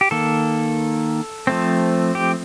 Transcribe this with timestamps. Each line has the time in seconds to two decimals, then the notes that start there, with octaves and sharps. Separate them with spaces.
0.01 G4
0.11 D#3 A#3 A4
1.47 F3 A3 C4
2.15 G4